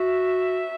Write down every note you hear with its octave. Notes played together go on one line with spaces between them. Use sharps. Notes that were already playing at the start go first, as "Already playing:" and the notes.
Already playing: F#4 E5